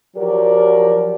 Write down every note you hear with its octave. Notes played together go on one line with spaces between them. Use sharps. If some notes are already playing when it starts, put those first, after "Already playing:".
F3 F#3 F#4 G4 A#4 D5